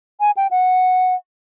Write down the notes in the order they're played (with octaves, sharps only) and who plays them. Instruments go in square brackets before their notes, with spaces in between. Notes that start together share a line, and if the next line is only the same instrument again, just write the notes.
[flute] G#5
G5
F#5